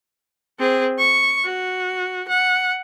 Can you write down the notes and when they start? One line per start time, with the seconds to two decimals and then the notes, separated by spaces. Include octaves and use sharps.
0.59 C4 G#4
0.99 C#6
1.45 F#4
2.28 F#5